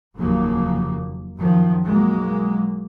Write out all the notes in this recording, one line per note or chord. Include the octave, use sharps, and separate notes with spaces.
F1 D#2 C#3 F3 F#3 A#3
F#2 D#3 F3 F#3
B1 F#3 G#3 A#3